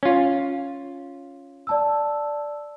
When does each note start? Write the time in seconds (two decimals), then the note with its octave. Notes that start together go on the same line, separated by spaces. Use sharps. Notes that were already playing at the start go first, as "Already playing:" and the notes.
0.03 C#4 F4
1.67 D5 A5 E6